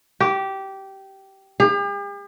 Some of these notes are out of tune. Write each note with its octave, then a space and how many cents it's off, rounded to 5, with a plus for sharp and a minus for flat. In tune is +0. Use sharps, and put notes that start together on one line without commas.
G4 -15
G4 +45